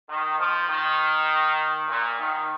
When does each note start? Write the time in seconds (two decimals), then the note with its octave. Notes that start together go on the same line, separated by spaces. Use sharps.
0.08 D#3
0.39 F3
0.69 D#3
1.89 A#2
2.19 D#3